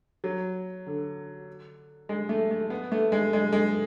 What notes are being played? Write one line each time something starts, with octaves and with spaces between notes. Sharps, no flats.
F#3
D3
G#3
A3
A3
B3
A3
G#3
G#3
G#3